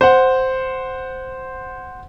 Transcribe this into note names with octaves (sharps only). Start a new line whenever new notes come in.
C5 F#5